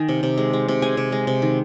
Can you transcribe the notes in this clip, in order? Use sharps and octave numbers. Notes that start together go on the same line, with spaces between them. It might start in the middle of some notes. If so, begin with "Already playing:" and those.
Already playing: D#3 G#5
C3
C3
G#3
G#3
C3
G#3 G#5
C3
G#3
C3
D#3